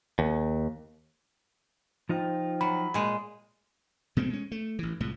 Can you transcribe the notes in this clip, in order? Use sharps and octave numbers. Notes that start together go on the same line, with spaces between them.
D#2
F3 D#4 F4 C5 G5
F#3 B5
A#2 G#3
B2 G#3 A3 C4
G#3 C#4
A3
A1 E3
C2 A2 F3 G#3